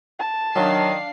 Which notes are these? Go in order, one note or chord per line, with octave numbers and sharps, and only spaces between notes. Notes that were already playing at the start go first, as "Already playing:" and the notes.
A5
D#3 F#3 D4 F5 C7